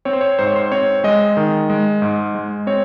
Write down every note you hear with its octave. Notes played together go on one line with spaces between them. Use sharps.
C4 C#5
C5
C#5
G#2 C5
C#5
C5
C4 C#5
G#3 D#5
D#3
G#3
G#2
G#3
C4 C#5